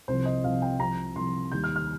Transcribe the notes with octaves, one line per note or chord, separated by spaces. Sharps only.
C2 C3 F3 C5
D#5
C2 C3 F3 F5
G5
C2 C3 F3 A#5
C2 C3 F3 C6
D#2 D#3 G3 G6
F6
F6